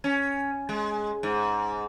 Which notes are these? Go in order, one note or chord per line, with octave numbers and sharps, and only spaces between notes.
C#4
G#3
G#2